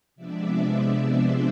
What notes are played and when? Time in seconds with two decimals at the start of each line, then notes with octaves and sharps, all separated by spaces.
0.16 C3 F3 G#3 B3 D4 D5 E5
0.99 C5 D5